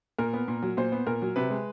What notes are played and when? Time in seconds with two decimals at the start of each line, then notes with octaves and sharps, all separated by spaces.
0.18 A#2 A#4
0.33 B3
0.48 A#2
0.62 F#3
0.77 A#2 C5
0.92 B3
1.07 A#2 A#4
1.22 F#3
1.36 C3 B4
1.51 G#3